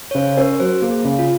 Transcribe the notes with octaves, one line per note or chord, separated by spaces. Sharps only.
C#5
C#3 C5
C#4 A#4
F#3 C5
A#3 G#4
C#3
F4